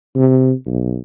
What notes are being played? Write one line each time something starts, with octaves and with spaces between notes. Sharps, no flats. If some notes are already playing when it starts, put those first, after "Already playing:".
C3
B1